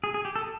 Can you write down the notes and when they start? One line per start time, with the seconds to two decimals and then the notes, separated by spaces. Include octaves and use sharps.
0.04 G#4
0.14 G#4
0.25 G4
0.36 A4